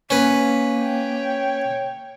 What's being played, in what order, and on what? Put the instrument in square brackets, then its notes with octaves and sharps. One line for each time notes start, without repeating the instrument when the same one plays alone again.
[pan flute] A#3 [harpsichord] C#4 B4
[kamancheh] C#5 G5